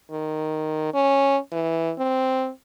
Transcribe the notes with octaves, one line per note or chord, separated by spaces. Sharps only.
D#3
C#4
E3
C4